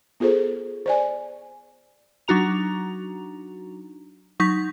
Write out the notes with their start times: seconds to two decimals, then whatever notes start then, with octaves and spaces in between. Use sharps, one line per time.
0.20 B3 F4 G#4 A4 C5
0.86 C5 D5 G#5
2.28 F#3 D4 D#4 F#4 A#5 F7
4.40 F#3 D#4 C#6 G6 B6